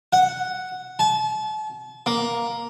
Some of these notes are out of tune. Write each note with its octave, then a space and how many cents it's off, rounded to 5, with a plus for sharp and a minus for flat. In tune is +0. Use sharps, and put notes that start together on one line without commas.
F#5 +0
A5 -40
A#3 +5